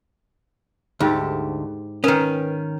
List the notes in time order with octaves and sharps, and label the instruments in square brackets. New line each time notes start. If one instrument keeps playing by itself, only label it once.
[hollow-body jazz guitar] D2 [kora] G#2 G4 A4
[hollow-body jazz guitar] D#3 C#4 [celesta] A#4 B4